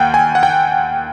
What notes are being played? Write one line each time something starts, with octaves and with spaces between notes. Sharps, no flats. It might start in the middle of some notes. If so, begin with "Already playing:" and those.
Already playing: D#2 F#5 G5
G#5
F#5
G5